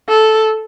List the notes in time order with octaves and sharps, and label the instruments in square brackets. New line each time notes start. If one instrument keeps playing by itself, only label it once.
[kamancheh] A4